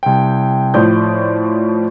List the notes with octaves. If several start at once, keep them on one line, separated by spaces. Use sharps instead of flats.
C2 G5
A2 F3 F4 D5 D#6 G6